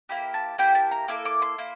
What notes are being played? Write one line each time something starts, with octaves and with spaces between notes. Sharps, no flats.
A#3 E4 G4
A5
A#3 E4 G4 G5
A5
A#5
A#3 E4 A4 D6
D6
C6
A#3 E4